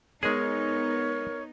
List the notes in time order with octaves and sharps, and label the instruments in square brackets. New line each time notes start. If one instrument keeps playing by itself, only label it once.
[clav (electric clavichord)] G#3 G#4 [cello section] B3 D#4 [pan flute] A#4 [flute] C#5